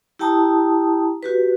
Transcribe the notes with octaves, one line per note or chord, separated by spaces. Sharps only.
E4 G4 G5 A5 A#5 D#6
F#4 G4 B4